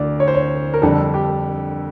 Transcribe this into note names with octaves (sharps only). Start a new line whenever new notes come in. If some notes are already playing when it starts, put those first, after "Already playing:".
Already playing: D2 D5
C#5
C5
C#5
A#4
F2 D3 G3 A4
G4